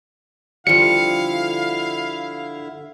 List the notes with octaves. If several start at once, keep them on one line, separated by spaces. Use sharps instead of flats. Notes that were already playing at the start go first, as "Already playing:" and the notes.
D3 F3 G3 E4 E5 F5 C#7